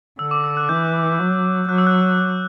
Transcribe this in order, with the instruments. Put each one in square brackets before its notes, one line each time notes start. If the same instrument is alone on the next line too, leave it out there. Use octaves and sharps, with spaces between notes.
[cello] D3 [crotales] E6
[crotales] D6
E6
F#6
[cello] E3 [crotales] G6
[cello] F#3
[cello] F#3 [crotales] F#6
[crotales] E6
F#6